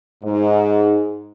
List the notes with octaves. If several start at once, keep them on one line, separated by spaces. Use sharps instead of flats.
G#2